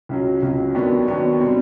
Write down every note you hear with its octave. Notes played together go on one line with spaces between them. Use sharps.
C#2 C#3 F#3
C#2 C#3 F#3
D#2 D#3 F#3 B3 D4
D#2 D#3 F#3 B3 D4
B2 G3 C4